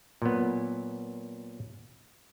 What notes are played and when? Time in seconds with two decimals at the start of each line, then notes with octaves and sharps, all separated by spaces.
0.22 A#2 F#3 B3